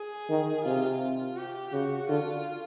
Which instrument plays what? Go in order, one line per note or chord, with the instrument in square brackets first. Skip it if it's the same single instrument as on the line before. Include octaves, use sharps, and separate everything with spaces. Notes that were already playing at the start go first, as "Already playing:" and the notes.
Already playing: [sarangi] G#4
[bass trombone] D#3
[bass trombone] C3 [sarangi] F4
[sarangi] F4
G4
[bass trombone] C#3 [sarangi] F#4
[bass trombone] D3 [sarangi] F4